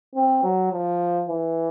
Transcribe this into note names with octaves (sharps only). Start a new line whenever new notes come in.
C4
F#3
F3
E3